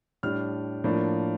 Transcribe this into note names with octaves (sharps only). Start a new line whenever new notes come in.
A2 G3 D4 F6
A2 F3 A#3 D4